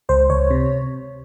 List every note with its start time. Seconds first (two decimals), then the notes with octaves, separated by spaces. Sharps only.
0.09 C#2 C5
0.30 C#2 C#5
0.51 C3